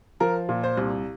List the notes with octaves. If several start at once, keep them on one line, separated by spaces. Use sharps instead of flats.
F3 A#4
A#2
C5
C2